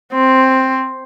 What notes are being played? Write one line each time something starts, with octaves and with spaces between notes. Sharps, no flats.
C4